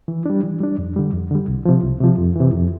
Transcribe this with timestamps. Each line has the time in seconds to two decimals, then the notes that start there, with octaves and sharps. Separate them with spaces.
0.08 E3
0.26 G3 D4
0.43 E3
0.60 G3 D4
0.78 F2
0.96 D3 G3
1.13 F2
1.31 D3 G3
1.48 C2
1.65 C3 F3
1.83 C2
2.01 C3 F3
2.18 F2
2.36 C3 E3
2.53 F2